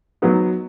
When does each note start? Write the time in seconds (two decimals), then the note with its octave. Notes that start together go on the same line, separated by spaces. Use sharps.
0.22 F#3 B3 D#4